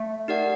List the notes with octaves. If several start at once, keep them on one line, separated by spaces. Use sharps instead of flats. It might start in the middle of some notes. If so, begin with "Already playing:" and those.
Already playing: A3
D#4 G4 A#4 D5 F#5